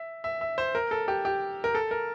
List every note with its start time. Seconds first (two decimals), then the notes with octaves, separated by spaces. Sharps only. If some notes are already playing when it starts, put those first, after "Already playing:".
Already playing: E5
0.24 E5
0.41 E5
0.58 C5
0.75 A#4
0.91 A4
1.08 G4
1.25 G4
1.64 A#4
1.75 A4
1.91 A#4